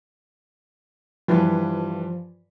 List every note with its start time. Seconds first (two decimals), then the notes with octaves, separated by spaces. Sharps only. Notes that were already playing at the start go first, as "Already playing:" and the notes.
1.28 G2 E3 F3